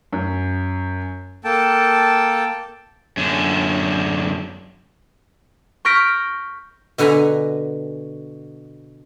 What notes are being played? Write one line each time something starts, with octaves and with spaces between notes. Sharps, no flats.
F#2
A#3 A4 G5 A5
F#2 D3
C#6 F6 G6 A#6 B6 D7
B2 D3 B4 G#5 A#5 B5